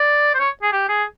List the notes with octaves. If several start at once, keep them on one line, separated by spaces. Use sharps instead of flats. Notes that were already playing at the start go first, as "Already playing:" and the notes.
Already playing: D5
C5
C#5
G#4
G4
G#4